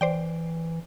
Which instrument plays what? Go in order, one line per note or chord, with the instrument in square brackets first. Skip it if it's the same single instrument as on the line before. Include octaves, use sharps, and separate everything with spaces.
[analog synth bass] E3 [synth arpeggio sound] C5 D5 G5